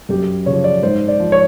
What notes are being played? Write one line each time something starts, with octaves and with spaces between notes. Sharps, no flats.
F#2 G4
C#3 F3 C#5
D5
G#2 C5
D5
F3
C#5